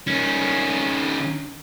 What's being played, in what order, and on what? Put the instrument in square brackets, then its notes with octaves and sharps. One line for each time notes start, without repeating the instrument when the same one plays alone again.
[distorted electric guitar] D#3 C#4